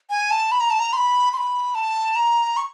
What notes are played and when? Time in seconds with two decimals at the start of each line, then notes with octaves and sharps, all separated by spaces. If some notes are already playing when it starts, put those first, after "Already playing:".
0.10 G#5
0.31 A5
0.52 B5
0.60 A#5
0.70 A5
0.80 A#5
0.93 C6
0.97 B5
1.33 C6
1.37 B5
1.75 A5
2.16 A#5
2.57 C#6